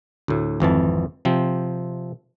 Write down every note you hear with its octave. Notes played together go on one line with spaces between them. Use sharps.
D2 A2
G#1 F2 E3 A5
C3 F3 C4